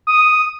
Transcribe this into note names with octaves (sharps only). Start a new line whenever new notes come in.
D#6